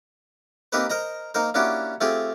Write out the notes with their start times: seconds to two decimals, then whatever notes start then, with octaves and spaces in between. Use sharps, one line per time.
0.72 A#3 C4 D#4 G4 B4 C5
0.90 A#4 C5 D#5 A#5
1.34 A#3 D#4 A#4 C5
1.54 A#3 C#4 D4 E4 F#4 G4
2.01 A3 C4 F4 G4 G#4